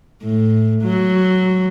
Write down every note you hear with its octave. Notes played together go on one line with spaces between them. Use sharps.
A2
F#3